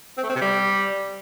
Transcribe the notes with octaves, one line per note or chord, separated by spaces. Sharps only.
C4
A3
C4
C3
G3